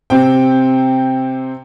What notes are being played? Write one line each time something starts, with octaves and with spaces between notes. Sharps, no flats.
C3 C4 G5